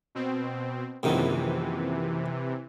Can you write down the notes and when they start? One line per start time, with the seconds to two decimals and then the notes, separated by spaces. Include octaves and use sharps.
0.15 B2 C4
1.03 A#1 F#2 C3 D#3 E3